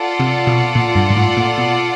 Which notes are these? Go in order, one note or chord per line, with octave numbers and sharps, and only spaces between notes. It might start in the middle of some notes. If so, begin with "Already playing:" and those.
Already playing: F4 A4 D5 F#5
C3
B2
A#2
G2
G#2
A2
A#2
B2